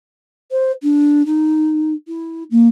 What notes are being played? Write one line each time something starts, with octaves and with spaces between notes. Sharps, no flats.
C5
D4
D#4
E4
A#3